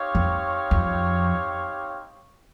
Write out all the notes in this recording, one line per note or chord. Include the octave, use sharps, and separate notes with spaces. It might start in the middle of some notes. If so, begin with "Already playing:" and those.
Already playing: C4 D#4 G4 C#5 F5
F2
F2